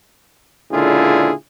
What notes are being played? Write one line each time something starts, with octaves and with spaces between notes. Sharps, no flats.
C#2 A#2 D3 E4 F4 G#4